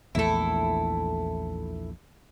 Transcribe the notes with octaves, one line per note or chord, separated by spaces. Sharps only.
A#1 E2 A3 E4 A4